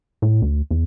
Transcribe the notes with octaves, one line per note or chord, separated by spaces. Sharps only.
A2
D2
E2